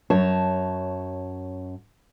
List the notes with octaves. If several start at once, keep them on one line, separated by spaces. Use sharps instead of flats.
F#2 C#5 A5